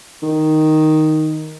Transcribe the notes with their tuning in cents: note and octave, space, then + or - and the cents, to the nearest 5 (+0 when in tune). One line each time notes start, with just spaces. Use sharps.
D#3 +0